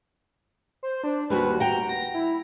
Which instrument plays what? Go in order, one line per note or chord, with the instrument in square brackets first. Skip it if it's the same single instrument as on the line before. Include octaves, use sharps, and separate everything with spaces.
[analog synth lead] C5
D4
[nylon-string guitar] D#2 G3 F#4 [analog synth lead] B4
[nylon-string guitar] F#5 G5 [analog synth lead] A#5
[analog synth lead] A#6
E4